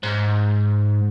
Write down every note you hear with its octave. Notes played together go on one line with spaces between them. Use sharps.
G#2